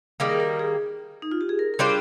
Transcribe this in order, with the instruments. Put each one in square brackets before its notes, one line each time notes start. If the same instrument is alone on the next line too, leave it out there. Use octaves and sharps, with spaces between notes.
[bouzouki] D#3 G3 A#3 [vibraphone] G#4
[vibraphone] A#4
A#4
G#4
D#4
F4
G4
G#4
A#4
A#4
[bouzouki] G3 D4 F4 C5 [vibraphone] G#4